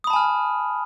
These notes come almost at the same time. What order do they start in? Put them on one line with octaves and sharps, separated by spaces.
D#6 B5 A5 G#5 F6